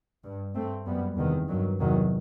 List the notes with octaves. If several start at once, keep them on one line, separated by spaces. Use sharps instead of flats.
G2
G2 A3 C4
F#2 G3 B3
E2 C3 D#3
G2 D#3 F#3
E2 C3 D#3 F#3